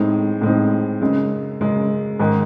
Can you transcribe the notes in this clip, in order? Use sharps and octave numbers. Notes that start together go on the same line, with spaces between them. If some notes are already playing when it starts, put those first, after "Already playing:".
Already playing: A2 G#3 C4 D#4
A2 G#3 C4 D#4
F#2 C#3 G#3
F#2 C#3 G#3
G#2 D#3 G#3